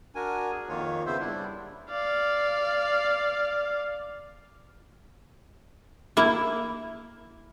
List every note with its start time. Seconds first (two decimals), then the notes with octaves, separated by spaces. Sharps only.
0.15 D4 F#4 A#4 G#5
0.52 G#4
0.69 F2 D#3 A#3 F4 C#5
1.06 C#3 B3 C5 E5
1.20 G3 D4 E4
1.90 D5 F5
6.17 A#3 E4 E5